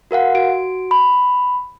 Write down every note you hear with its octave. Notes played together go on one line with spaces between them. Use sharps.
F#4 A#4 F5 F#5
F#4 D7
B5